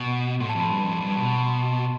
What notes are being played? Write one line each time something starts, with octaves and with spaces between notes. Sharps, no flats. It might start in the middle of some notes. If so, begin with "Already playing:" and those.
Already playing: B2
A2 C6
A5
F2
B5
G2 C6
F2 B5
G2 B5
A5
B2 B5
B5
C6
A5